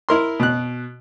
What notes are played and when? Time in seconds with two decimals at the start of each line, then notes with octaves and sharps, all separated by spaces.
0.09 E4 A#4 C6
0.40 B2 F#6